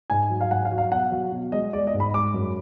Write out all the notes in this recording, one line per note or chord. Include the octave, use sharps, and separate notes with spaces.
G#2 G#5
F#3
F5
G#2 F#5
F5
F#3
F5
B2 F#5
F#3
B2
G#3 D#5
G#3 D5
D#5
G#2
B5
G#3 D6
F#2